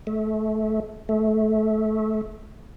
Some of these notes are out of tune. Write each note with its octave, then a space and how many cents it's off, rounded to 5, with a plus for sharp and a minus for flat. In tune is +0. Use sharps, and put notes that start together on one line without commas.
A3 -25
A3 -20